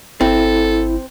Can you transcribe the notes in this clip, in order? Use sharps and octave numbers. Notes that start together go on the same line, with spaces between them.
G#1 C4 E4 A4